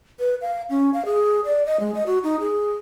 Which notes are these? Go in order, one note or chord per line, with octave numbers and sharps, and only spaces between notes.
B4
F5
C#4
F5
G#4
D5
D#5
G#3
D#5
F#4
D#4
G#4